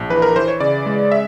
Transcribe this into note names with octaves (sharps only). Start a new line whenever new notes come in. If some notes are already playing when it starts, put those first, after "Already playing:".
Already playing: A#1
E3 B4
A#4
E3 C5
C#5
C#3 D5
G#3
E5